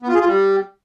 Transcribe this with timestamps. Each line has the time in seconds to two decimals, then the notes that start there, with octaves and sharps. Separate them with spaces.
0.02 B3
0.09 F4
0.15 G#4
0.21 F4
0.27 G3